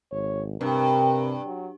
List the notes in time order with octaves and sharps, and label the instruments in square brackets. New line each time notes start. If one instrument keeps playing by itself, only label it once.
[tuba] G#1 [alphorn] C#5
[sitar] G2 [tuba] C3 [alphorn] A#4
[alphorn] F#3